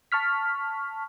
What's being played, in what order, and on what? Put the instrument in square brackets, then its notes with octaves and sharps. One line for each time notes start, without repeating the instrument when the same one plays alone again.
[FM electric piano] A5 C#6 F6 B6